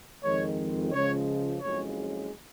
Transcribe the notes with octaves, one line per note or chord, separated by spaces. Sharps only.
F2 D#3 G#3 C#5
C#2 C#3 F3 G#3 C#5
F#1 F2 C#3 G#3 C#5